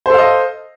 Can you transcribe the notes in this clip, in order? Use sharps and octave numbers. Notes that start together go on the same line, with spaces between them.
A4 C5 D#5 F5